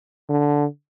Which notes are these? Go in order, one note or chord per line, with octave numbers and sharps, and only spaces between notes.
D3